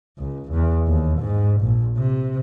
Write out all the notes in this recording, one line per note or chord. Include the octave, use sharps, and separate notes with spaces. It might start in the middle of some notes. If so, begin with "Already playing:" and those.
C#2
E2
D#2
G#2
A#1
C3